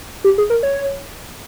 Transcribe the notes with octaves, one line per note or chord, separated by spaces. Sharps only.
G4
G#4
A#4
C#5